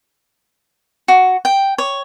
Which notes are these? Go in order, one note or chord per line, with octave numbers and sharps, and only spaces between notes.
F#4
G5
C#5